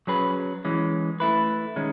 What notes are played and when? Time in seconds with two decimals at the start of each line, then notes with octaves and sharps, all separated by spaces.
0.07 F#3 C#4 G#4 B4
0.65 E3 G#3 C#4
1.20 A3 E4 B4
1.76 D#3 G#3 C#4